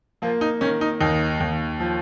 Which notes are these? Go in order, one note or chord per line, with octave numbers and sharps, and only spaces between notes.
F3 A#3 F4
D#4
D#3 C#4
D#4
D#2 D#4
D#2
F3